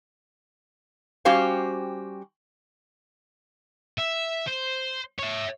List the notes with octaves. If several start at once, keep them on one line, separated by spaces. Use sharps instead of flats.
G3 C#4 F#4 G4 C5 F5
E5
C5
C#5 E5